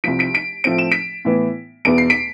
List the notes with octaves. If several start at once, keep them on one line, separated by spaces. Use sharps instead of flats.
C2 C3 F3 B6 D7
B6 D7
B6 D7
A2 F3 A3 C4 D7
E7
B6 D7
A2 E3 B3
E2 B2 B3 D7
C7
B6 D7